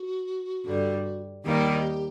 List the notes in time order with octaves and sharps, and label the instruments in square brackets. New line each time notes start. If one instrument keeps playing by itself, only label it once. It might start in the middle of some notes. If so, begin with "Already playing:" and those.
Already playing: [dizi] F#4
[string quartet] G2 D3 G3
[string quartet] D#2 D#3 G3 A#3 D#4 [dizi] G4